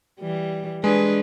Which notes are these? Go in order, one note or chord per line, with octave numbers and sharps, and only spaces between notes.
E3 G3
G#3 D4 G#4 B4